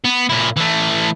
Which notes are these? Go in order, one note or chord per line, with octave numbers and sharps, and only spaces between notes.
B3
A#2 E4
E3 A3